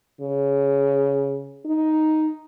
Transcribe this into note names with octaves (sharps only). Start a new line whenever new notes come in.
C#3
D#4